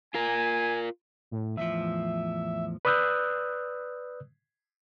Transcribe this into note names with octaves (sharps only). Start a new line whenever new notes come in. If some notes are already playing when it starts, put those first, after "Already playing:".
F4 A#4 G#5
A2
E2 A2 F3 E5
B4 D5 D#6 E6 F#6 G6